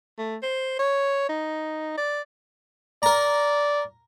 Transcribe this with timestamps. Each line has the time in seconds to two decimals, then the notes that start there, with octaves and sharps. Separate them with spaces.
0.18 A3
0.42 C5
0.79 C#5
1.29 D#4
1.97 D5
3.03 A#4 D5 A#5